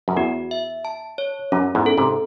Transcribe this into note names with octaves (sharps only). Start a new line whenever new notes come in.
F#2
E2 F#4
E5
A5
C#5
F#2 C#4
E2 G#2
A4
G#2 C3